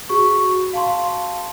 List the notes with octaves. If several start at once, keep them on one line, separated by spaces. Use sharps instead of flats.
F#4 G#4 C#6
F5 A5 C6